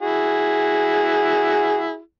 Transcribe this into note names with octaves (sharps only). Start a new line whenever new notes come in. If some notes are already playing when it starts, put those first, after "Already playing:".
E4 F#4 G#4